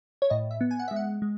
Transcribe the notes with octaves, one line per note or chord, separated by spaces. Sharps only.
C#5
A2 D#5
E5
B3
G#5
F#5
G#3 E5
F#5
G#3